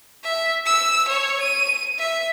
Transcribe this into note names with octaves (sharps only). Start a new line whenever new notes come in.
E5
E6
C#5
D#7
E5